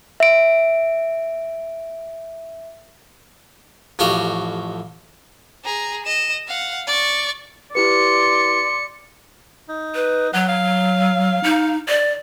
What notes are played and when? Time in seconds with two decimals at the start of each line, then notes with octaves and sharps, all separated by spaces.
0.20 E5 D7
3.99 A1 F2 F#4 G4 F5
5.65 G#4 A#5
6.06 D#5 E7
6.48 F5 F#5
6.87 D5 C#6
7.75 E4 G4 B4 D5 C6 C#7
9.69 D#4
9.95 B4
10.34 F#3 F#5
10.48 F5
11.44 D#4
11.88 D5